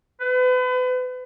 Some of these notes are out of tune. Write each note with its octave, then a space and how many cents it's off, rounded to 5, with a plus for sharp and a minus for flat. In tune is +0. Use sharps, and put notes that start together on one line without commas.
B4 +35